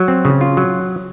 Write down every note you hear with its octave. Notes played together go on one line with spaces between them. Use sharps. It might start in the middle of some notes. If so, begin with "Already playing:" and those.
Already playing: F#3
C4
C#3
F4
F#3